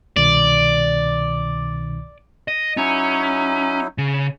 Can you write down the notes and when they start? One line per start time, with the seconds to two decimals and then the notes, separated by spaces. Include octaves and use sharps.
0.17 C2 B2 D#3 D5
2.48 D#5
2.77 F#3 C#4 D#4 E4
3.98 C#3